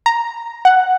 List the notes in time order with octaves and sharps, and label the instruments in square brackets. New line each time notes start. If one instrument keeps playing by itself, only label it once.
[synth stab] A#5
F#5